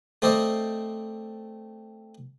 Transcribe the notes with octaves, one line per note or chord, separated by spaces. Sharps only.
A3 C4 C5 D5 D#5